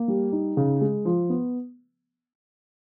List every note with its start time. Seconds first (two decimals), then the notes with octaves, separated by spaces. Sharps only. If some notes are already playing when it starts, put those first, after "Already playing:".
Already playing: A#3
0.08 G3
0.32 D#4
0.57 C#3
0.81 G#3
1.05 F3
1.30 B3